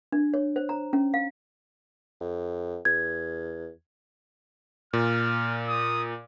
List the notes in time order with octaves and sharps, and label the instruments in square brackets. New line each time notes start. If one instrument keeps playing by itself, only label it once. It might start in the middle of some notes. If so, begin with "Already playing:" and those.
[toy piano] D4
C#5
C5
A#5
C#4
F5
[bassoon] F2
[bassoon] E2 [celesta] G#6
[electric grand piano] A#2 [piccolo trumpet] F6
[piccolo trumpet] D#6